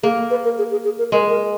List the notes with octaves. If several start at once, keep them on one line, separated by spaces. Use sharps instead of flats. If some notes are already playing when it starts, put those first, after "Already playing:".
A#3 G#4
B4
A#4
G#4
G#4
G#4
A#4
G#3 A#4
A#4